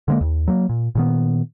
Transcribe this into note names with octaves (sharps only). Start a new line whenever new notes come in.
D3 G#3 A#3
D#2
F#3 A#3
A#2
A#2 D#3 B3